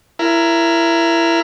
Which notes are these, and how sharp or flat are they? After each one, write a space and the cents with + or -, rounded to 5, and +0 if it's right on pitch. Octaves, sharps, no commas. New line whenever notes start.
E4 +20 A#4 +0